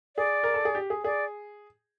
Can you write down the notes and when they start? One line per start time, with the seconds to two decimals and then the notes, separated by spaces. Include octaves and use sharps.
0.16 G#4 D5
0.44 A#4
0.54 A4
0.65 G#4
0.75 G4
0.90 G#4
1.04 G#4 D5